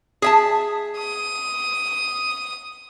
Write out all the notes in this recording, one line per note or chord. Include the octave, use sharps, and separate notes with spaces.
G#4 E5 A5
D#6